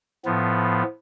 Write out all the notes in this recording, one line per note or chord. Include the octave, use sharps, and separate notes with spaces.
A2 F3 B3